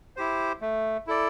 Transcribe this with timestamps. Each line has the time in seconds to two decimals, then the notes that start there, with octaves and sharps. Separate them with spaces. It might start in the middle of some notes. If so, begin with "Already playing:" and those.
0.16 E4 G4 C5
0.61 A3
1.07 E4 A4 D5